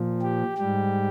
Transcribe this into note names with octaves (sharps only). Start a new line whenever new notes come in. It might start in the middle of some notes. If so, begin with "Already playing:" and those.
Already playing: A#2 F3
G4
G#2 G3 G4